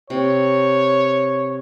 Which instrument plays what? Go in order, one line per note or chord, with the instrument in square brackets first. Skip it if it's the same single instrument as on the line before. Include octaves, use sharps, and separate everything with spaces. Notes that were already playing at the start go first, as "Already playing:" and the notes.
[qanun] C3 [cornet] C#5